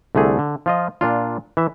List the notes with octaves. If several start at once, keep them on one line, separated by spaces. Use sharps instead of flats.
C2 D3 A3 G#4
D3
F3 F4 D#5
A#2 D4 F4
E3 E5